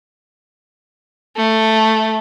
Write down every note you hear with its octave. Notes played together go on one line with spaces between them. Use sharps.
A3